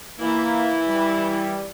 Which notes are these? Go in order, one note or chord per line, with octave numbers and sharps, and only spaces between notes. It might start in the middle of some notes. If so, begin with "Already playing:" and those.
E3 A#3 E4
G3